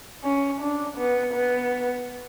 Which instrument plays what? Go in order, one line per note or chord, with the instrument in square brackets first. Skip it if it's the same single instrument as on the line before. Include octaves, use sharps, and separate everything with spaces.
[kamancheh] C#4
D4
B3
B3